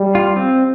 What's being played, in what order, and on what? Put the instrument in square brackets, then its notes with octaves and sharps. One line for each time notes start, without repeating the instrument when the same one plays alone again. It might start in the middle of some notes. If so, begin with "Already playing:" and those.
Already playing: [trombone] G3
[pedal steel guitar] F4
C4